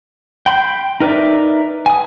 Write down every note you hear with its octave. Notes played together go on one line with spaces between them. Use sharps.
G5 B5 C6 G6
D#4 A#4 B4 D5 E5
G#5 D#6